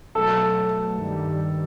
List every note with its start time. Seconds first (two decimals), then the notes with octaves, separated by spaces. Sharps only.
0.15 B2 F#3 A3 A4
0.97 G2 D#3 G3